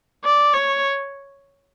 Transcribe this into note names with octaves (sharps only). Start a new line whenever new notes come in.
D5
C#5